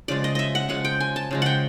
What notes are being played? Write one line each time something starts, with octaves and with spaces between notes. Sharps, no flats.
C#3 F3 G#3 D5
D#5
D#5 E5
F#5
C#3 F3 G#3 F#5
G5
G#5
A5
C#3 F3 G#3
F#5 G5